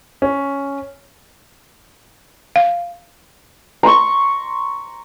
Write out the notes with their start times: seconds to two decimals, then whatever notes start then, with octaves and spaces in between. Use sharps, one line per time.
0.22 C#4
2.56 F5
3.83 A#5 C6 C#6